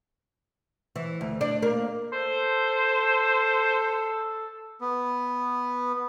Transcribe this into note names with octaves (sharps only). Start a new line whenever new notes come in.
E3
D2
D4
A#3
A4 C5
B3